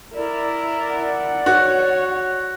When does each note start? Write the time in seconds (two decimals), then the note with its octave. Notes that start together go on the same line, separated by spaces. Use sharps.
0.15 E4 A#4 D5
0.94 F#5
1.46 F#4 C#5